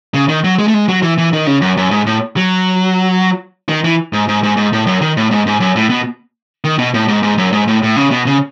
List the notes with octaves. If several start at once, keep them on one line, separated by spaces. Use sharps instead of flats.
C#3
D#3
F#3
G#3
A3
G#3
F#3
E3
E3
D#3
C#3
F#2
F#2
G#2
A2
F#3
D#3
E3
G#2
G#2
G#2
G#2
A2
F#2
D#3
A2
G#2
G#2
F#2
A2
B2
D#3
B2
A2
G#2
G#2
F#2
G#2
A2
A2
C#3
B2
C#3